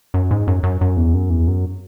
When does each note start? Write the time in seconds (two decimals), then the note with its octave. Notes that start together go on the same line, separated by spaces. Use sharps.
0.14 F#2
0.31 G#2
0.47 F#2
0.63 F#2
0.81 F#2
0.97 E2
1.14 F#2
1.30 E2
1.48 F#2